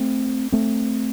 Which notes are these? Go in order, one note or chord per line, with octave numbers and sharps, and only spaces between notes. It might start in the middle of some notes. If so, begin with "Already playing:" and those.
Already playing: A3 C4
A3 C4